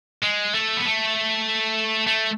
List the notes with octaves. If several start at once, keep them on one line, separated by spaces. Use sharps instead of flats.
G#3
A3
B3
A3
A3